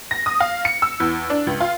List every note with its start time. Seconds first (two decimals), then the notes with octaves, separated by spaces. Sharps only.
0.11 A#6
0.26 D#6
0.40 F5
0.65 C#7
0.82 E6
1.00 E2
1.30 D4
1.47 C#2
1.60 F4